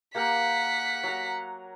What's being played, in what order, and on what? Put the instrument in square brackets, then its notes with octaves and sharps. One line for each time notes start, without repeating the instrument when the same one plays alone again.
[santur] A#3 G4 A#4 [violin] F#5 B6
[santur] F#3 A#5